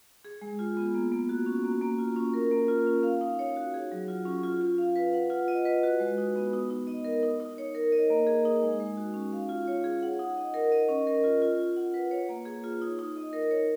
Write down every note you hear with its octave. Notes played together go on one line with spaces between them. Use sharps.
G#4
G#3
F4
B3
A#3
A#3
F#4
C#4
A#3
A#3
F4
C#4
A#4
A#3
F4
C#4
F5
D#4
C#5
F#4
G#4
F#3
F4
C#4
F4
F4
F5
B4
F#5
F4
D#5
B4
F#4
G#3
D#4
B3
D#4
D#4
D#5
A#4
D#4
D#4
C#5
A#4
D#5
A#3
G#4
D#4
G#3
G#3
F#4
C#4
F5
F4
C#5
G#4
F#5
D#4
D#5
A#4
D#5
C#4
A#4
F4
F4
F4
F#5
B4
C#5
A#3
G#4
F4
D#4
D#4
D#5
A#4
C#5